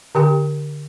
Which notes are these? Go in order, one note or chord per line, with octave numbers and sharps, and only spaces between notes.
D3 G4 G5